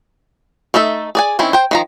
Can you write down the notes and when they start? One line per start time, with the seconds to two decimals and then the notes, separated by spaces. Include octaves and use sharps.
0.74 A3 D#4 A4 E5
1.15 G#4 D5 G#5
1.39 D#3 C4 C#4 E4
1.53 C5 G5
1.71 D#3 F3 A#5